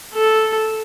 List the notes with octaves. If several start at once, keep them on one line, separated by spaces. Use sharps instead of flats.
A4